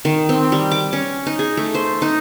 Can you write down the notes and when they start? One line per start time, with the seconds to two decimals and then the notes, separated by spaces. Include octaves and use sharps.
0.05 D#3
0.29 C4
0.52 G3
0.71 D6
0.93 C#4
1.26 D#4
1.39 G#4
1.57 A3
1.74 C5
2.02 D#4